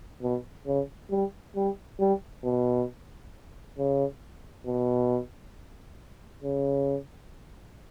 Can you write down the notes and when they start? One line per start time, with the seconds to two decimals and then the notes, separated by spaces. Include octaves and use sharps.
0.23 B2
0.67 C#3
1.11 G3
1.56 G3
2.00 G3
2.44 B2
3.78 C#3
4.66 B2
6.43 C#3